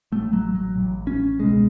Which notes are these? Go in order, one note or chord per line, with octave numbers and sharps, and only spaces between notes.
A1 A2 A3
F#3
F#3
A1 A2
C#4
C#2 B2 G#3